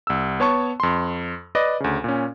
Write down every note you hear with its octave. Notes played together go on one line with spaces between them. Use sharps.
C2 E6
B3 C#5 A5 C#6
F2 C6
B4 D5 D#5
D2 C#3
A#2 C#4